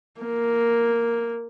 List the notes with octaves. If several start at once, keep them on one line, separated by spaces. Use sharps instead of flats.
A#3